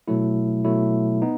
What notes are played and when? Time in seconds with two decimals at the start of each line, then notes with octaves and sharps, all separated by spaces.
0.08 B2 F#3 A3 E4
0.64 B2 F#3 A3 E4
1.22 B3 D#4